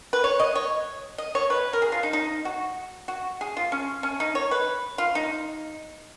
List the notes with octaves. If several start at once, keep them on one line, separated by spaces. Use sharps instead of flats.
B4
C#5
D#5
C#5
D#5
C#5
B4
A#4
G#4
F4
D#4
D#4
F#4
F#4
G#4
F4
C#4
C#4
D#4
C#5
B4
F4
D#4